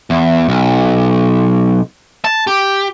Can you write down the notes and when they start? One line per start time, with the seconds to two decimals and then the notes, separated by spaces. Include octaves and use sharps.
0.10 E2
0.49 B1
2.25 A5
2.47 G4